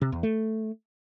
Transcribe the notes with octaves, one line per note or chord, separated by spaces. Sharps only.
C3
E2
A3